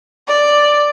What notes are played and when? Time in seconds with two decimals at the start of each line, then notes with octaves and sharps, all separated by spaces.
0.27 D5